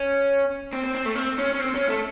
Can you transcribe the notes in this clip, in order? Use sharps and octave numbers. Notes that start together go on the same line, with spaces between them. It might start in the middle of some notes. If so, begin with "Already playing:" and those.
Already playing: C#4
C4
C4
C4
A3
C4
C#4
C#4
C4
C#4
A3